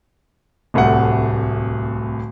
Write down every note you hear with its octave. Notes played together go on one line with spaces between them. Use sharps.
D1 C2 A3 F#5